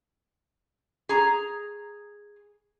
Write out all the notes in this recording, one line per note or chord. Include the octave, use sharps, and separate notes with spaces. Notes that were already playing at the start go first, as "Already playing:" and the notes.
G#4 A#5